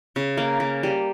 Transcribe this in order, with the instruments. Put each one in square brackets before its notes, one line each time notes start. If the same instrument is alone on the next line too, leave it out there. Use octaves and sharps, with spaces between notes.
[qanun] C#3
A#3
A#3
G3